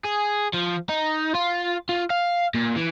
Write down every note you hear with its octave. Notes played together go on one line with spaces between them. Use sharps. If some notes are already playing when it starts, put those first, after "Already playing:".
G#4
F3
D#4
F4
F4
F5
A#2
E3